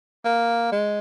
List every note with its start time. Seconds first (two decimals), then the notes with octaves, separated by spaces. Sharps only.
0.25 A#3
0.72 G#3